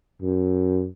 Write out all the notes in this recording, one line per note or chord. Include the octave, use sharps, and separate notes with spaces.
F#2